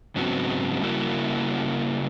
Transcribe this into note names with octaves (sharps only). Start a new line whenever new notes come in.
G#2 C#3 F#3 B3 C4 F#4
C#3 G3 A#3 E4 F#4